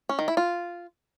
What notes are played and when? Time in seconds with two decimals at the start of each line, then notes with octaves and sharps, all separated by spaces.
0.09 C#4
0.19 D#3
0.28 E4
0.37 F4